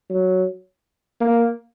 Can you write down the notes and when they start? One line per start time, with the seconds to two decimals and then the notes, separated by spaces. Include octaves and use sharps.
0.10 F#3
1.21 A#3